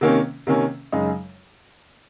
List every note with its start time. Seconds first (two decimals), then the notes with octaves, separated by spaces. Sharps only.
0.01 C3 D#3 A#3 C#4
0.47 C3 D#3 A#3 C#4
0.92 F#2 C#3 G#3 D#4